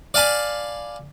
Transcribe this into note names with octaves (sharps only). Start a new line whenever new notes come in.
D5 F5 G#5 A5 B5